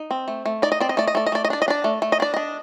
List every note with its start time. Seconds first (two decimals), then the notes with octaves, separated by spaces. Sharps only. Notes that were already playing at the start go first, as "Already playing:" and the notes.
Already playing: D#4
0.11 C4
0.28 A3
0.46 A3
0.62 D#4 D5
0.72 D#5
0.80 C4 D5
0.89 D#5
0.97 A3 D5
1.07 D#5
1.15 A3 D5
1.26 D#5
1.32 A3 D5
1.45 D#5
1.50 D4 D5
1.62 D#5
1.68 D4 D5
1.84 A3
2.02 A3
2.12 D#5
2.20 D4 D5
2.34 D4 D#5